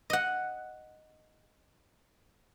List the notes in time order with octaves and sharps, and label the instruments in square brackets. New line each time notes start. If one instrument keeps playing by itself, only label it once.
[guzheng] D#5 F#5